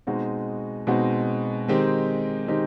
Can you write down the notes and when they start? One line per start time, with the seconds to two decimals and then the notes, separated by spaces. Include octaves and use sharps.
0.07 B2 G#3 C4 D#4 F#4
0.87 B2 G#3 C4 D#4 F#4
1.68 D#3 G#3 C4 D#4 G4
2.48 D#3 G#3 C4 D#4 G4